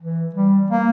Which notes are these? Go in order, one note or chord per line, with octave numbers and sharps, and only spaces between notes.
E3
G3
A#3